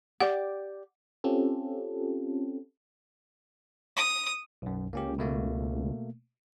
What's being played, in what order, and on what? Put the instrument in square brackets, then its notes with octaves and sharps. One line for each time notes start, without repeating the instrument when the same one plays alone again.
[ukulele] G4 D5 [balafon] F#5
[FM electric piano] C4 C#4 F4 G4 A4
[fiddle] D#6
[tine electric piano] B1 F#2
[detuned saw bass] C#2 [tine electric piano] A#3 C#4 G4
[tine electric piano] B2 A3 A#3